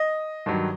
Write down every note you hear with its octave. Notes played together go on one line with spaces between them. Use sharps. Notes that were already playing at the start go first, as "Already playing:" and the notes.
Already playing: D#5
G2 D#3 F#3